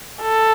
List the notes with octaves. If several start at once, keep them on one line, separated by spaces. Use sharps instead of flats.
A4